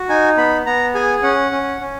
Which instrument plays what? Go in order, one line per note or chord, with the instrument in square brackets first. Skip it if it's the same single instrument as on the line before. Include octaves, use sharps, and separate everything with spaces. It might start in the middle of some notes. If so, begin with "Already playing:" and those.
Already playing: [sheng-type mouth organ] F#4
D#4 G#5
B3 B5
B3 A#5
G#4 G#5
C#4 F#5
C#4
C#4